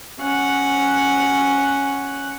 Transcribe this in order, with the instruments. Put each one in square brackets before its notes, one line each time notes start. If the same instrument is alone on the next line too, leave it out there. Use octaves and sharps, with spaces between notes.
[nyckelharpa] C#4 F#5